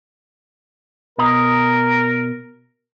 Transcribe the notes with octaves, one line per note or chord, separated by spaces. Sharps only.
B2 A#4 D#5 A#5